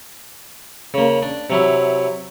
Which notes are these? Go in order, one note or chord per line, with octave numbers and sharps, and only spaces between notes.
C#3 A#3
D4
C3 F#3 E4